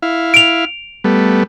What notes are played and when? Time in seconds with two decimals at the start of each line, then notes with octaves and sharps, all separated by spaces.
0.02 E4 F5
0.34 D7 F7
1.04 G3 A3 B3